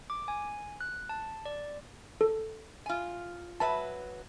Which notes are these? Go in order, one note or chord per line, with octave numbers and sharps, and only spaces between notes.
D6
G#5
F#6
A5
D5
A4
F4 G#5
F#3 B4 E5 A5